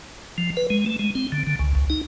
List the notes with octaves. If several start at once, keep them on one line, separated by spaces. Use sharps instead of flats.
F3
B4
G#3
A3
G#3
C4
D3
D3
C#2
C#2
D#4